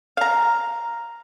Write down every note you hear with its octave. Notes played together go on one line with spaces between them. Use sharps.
F5 A#5